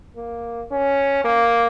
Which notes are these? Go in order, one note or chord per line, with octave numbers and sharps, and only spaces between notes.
A#3
C#4
A#3